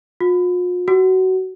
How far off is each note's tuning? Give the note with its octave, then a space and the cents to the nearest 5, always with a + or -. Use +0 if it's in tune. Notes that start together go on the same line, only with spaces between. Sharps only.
F4 +45
F#4 +20